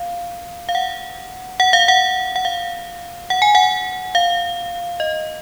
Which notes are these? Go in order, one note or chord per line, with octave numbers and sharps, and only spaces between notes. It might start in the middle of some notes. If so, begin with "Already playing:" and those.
Already playing: F5
F5
F#5
F#5
F5
F#5
F#5
F5
F#5
G#5
F#5
F5
D#5